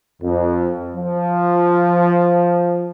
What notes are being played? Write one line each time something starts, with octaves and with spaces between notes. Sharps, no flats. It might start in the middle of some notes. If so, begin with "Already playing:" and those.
F2
F3